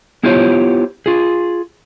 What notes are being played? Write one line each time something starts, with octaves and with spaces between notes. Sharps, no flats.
B3 E4 F4 G4 C5 C#5
F4 G#4